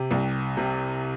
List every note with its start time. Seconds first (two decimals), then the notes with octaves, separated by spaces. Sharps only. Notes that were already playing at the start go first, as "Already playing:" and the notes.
Already playing: C3 G4
0.11 C2
0.57 C3